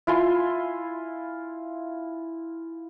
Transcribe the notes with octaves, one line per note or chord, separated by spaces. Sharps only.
E4 F4 G#5 C6